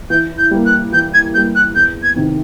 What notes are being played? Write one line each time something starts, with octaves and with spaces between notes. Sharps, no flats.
E3 G6
G6
G3 A#3
F#6
E3 G6
G#6
G3 A#3 G6
F#6
E2 G6
G#6
C3 D#3